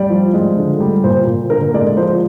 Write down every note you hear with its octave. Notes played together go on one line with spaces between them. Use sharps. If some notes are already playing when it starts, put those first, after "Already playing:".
Already playing: G3 D5
F3
G#3
D3
G3
A#2 C5
A#2
D3 A#4
G#3 D5
F3 C5